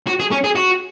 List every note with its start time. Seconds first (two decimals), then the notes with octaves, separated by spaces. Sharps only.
0.07 F#4
0.20 G#4
0.32 C#4
0.44 G#4
0.56 F#4